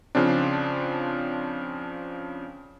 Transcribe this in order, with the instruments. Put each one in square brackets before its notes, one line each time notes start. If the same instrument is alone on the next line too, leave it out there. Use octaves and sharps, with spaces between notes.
[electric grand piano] C#3 F3 C4 D4